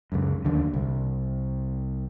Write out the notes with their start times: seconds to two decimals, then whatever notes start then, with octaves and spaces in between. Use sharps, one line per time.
0.12 C#2 F#2
0.45 D#2 D3
0.74 C2